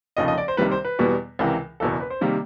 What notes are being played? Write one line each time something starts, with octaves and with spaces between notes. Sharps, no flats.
F1 D#2 C#3 F3 D#5
D#5
D5
C5
C2 C3 D#3 G3 B4
C5
B4
E2 B2 G3 B3
C#2 C3 E3 A#4
F#1 E2 B2 A4
A#4
B4
C5
C3 D#3 G3 A#3